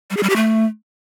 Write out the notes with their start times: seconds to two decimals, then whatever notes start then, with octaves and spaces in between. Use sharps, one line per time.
0.10 G3
0.17 G#4
0.23 G3
0.29 G4
0.36 A3